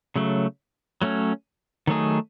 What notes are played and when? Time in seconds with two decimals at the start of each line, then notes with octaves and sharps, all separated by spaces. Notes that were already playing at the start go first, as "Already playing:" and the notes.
0.16 C#3 F#3 A3
1.02 F#3 A3 C#4
1.87 D#3 F#3 A3 D#4 G#4